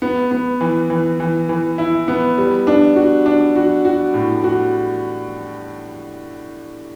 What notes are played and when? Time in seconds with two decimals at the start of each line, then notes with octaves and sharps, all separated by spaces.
0.02 B3
0.31 B3
0.61 E3
0.90 E3
1.20 E3
1.49 E3
1.78 E4
2.08 B3
2.38 G3
2.67 D4
2.96 F#4
3.26 D4
3.55 F#4
3.85 F#4
4.14 A2
4.44 F#4